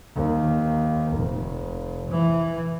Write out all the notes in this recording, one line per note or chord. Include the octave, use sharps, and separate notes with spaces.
D#2
F1
E3